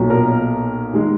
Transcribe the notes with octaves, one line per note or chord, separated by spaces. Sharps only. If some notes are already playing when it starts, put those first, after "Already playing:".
Already playing: B1 A#2 F#3
A#4
D#3 G#3